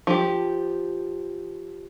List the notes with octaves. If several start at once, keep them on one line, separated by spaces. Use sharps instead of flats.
F3 G4